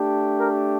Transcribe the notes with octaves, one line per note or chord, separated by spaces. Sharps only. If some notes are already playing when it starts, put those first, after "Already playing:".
Already playing: A3 D4 G4
A#4